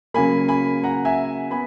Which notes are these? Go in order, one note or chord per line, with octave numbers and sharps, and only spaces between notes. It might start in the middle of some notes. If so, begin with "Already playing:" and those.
C#3 F#3 A#3 G#5 B5
G#5 B5
F#5 A#5
E5 G#5
B3 G#5 B5